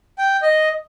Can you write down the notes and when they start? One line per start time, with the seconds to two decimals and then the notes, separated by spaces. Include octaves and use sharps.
0.18 G5
0.42 D#5